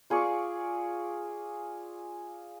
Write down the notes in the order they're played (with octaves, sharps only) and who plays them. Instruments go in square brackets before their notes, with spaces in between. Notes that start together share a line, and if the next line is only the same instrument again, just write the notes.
[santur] F4 G#4 D5 C#6